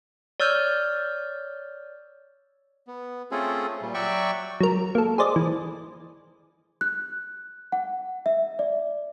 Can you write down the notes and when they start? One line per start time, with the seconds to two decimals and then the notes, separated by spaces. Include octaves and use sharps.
0.40 C#5 D5 E6 F6 G6
2.87 B3
3.31 A3 C4 C#4 F4 G#4 A4
3.82 A#2 G3
3.94 F#3 F#4 D5 E5 G5 C#6
4.60 F#3 A#4
4.95 A#3 A4
5.18 G#4 C5 D5 D#5
5.36 E3
6.81 F#6
7.72 F#5
8.26 E5
8.59 D5